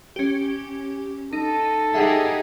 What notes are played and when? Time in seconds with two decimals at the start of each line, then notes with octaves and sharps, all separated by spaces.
0.16 C#4 G4
1.33 D#4 A4
1.94 D#4 G4 G#4 E5 F#5